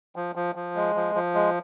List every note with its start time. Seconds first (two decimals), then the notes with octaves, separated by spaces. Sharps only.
0.16 F3
0.35 F3
0.55 F3
0.75 G#3
0.95 F3
1.15 F3
1.34 G#3